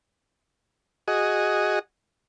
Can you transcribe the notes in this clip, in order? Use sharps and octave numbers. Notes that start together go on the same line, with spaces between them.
F#4 G#4 D#5